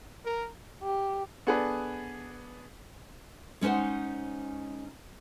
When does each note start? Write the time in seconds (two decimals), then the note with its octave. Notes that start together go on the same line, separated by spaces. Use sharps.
0.25 A#4
0.83 G4
1.47 B3 D4 G#4 A4 B4
3.61 G#3 C#4 D#4 C5 F#5